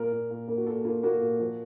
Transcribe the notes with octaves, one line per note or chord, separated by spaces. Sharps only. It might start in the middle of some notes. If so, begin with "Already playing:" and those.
Already playing: A#2 A#4
A#2
A#2
A#3
F#4
A#2 A4
A#3 F4
A#3 F#4
A#2
F3